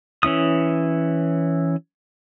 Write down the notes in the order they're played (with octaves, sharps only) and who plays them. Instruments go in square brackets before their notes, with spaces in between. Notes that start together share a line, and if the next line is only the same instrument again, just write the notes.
[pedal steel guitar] E3 C#4 E4 D#6